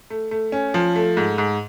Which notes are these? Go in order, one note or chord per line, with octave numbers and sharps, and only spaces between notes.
A3
A3
C#4
F3
A3
G#2
G#2